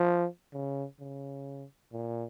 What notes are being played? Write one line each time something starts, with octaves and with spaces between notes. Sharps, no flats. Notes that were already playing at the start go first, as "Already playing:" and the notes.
Already playing: F3
C#3
C#3
A#2